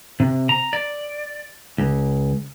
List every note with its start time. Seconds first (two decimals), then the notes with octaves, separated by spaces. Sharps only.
0.20 C3
0.49 A#5
0.73 D5
1.78 C#2